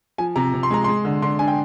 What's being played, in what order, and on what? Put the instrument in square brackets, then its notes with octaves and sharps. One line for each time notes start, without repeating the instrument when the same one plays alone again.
[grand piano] F3 G#5
C3 A#5
C3
C6
G#3 A#5
G#3 C6
D3
D3 C6
D4 G#5
G5